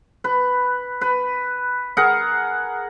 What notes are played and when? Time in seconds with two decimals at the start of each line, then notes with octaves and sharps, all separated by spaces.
0.24 B4
1.01 B4
1.97 G#4 A#4 F#5